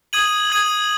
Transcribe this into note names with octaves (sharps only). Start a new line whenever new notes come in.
D#6 G#6 D#7 F#7
D#6 G#6 D#7 F#7